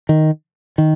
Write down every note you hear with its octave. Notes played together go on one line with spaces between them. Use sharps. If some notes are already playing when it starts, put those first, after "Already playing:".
D#3
D#3